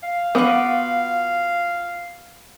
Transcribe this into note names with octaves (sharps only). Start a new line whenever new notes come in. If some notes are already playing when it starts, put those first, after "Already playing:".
F5
B3 F4 F#4 D6